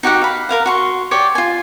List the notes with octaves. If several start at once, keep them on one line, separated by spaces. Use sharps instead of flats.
D#4 F#4 G4 F#5
F5 B5
A#4 F5 F#5
F#4 C6 C#6
G4 C#5 D5 C6
F4 G#5